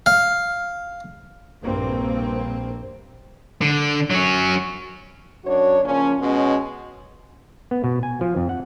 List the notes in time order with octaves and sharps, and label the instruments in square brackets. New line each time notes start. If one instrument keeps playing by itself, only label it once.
[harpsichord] F5
[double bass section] A#1 G2 A#3 C4
[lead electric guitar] D3
F#3 C#4
[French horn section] F#2 D4 F#4 C#5
C#3 F3 A#3 C#4
B2 G#3 C#4
[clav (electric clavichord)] B3
B2
G#5
F3
F2
F#5